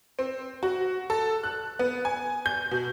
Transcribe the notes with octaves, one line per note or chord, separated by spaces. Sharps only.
C4
F#4
A4
F#6
B3
G#5
G6
B2